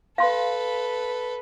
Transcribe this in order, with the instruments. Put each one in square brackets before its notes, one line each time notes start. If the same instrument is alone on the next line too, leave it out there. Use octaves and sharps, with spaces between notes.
[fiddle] A4 B4 [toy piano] F5 C6